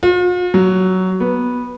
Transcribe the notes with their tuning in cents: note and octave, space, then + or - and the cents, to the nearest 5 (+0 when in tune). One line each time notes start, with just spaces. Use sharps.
F4 +45
F#3 +10
B3 -10